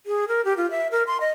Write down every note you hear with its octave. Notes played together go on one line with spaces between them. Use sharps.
G#4
A#4
G4
F4
E5
A#4
C6
D#5